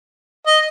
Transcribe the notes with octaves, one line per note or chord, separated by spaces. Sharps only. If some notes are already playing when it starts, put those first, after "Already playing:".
D#5